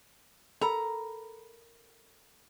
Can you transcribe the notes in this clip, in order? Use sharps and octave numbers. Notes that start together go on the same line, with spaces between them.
A4 A#4 A#5 B5